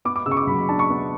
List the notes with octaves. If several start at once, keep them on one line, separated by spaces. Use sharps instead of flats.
B3 D6
D6
C#3 E6
C#6
D6
F#3 B5
B5
D4 A5
C#6
B3